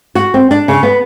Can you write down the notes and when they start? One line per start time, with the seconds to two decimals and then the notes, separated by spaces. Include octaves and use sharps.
0.15 F#4
0.34 C4
0.51 D4
0.68 C#3
0.83 B3